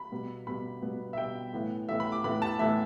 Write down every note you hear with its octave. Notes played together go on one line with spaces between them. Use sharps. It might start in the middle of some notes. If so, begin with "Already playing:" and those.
Already playing: B5
B2 G3 B3
B2 G3 B3 B5
B2 G3 B3
E5
B2 G3 B3 G5
A2 E3 B3
A2 E3 B3 E5
B5
D6
A2 E3 B3 B5
A5
A2 E3 B3 E5